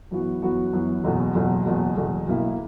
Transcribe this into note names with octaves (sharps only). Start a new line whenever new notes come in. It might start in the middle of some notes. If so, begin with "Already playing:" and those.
F#2 E3 B3 F#4
F#2 E3 B3 F#4
F#2 E3 B3 F#4
F#1 E2 B2
F#1 E2 B2
F#1 E2 B2
F#1 E2 B2
B1 B2 A#3 E4